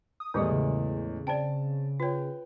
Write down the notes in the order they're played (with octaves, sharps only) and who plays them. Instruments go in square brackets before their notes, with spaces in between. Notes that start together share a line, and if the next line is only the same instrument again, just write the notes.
[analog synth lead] D#6
[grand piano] E2 A2 G#3 [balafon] D#3 G3 G4
[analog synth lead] C#3
[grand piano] C4 A5 D7 [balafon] D5 G5
[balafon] F4 C#5 [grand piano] B4 G5